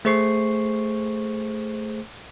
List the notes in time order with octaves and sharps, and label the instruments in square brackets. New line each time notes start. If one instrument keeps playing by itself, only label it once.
[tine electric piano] A3 G#4 C5 C#6 C7